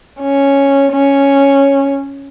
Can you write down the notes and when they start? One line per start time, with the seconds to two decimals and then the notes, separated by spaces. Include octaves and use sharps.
0.21 C#4
0.92 C#4